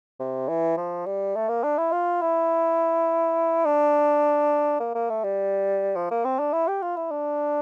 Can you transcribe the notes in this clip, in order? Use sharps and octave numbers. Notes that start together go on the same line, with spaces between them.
C3
E3
F3
G3
A3
A#3
D4
E4
F4
E4
D4
A#3
A#3
A3
G3
F3
A#3
C4
D4
E4
G4
F4
E4
D4